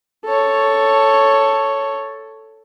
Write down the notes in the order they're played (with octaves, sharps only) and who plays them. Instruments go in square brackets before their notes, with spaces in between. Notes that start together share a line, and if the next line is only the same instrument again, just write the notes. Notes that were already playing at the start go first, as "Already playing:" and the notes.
[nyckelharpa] A4 C#5